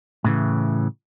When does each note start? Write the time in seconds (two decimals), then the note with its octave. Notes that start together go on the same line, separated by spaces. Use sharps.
0.24 A2 C#3 E3